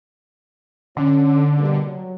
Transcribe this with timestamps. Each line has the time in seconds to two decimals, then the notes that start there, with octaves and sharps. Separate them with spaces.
0.97 D3 C#4
1.58 B2 G3 A#3
1.86 F#3